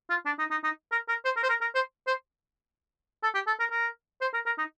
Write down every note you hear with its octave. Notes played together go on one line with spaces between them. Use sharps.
F4
D4
D#4
D#4
D#4
A#4
A#4
C5
A#4
C5
A#4
A#4
C5
C5
A4
G4
A4
A#4
A#4
C5
A#4
A#4
D#4